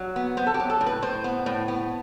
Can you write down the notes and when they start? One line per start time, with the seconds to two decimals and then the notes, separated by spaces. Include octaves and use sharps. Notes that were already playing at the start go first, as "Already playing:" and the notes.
Already playing: F#3
0.16 B3
0.37 B3 C5
0.47 A4
0.54 G4
0.60 F#3
0.70 A4
0.81 A2
0.86 B4
1.02 A2 C5
1.24 B3
1.46 A2
1.68 B3